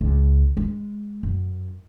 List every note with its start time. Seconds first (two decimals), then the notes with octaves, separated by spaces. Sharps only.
0.01 C#2
0.57 G#3
1.23 F#2